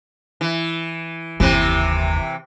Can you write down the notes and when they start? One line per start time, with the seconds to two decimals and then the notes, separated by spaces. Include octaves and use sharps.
0.41 E3
1.40 F#1 D#2 C3 E3